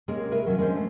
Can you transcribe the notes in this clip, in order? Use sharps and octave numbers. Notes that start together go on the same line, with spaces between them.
C3 G#3 A#3 C#4 G#4 A#4
A#4 B4 E5
D#3 F#3 G3 A3 C#4
G#3 C#4 D4 C5
A3